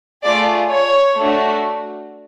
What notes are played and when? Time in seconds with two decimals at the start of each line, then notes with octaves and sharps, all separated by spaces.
0.24 A3 F4 G#4 D5
0.71 C#5
1.18 A3 D4 F#4